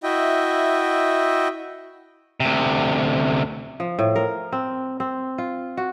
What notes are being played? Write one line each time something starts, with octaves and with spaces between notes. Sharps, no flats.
E4 F#4 D#5 E5 G5
D2 C3
F3
A2
A#4
C4
C4
F4
F#4